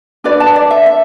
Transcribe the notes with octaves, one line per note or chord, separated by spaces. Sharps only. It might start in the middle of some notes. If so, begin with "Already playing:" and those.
D4 F#4 B4 D5
A5
D5
E5
E5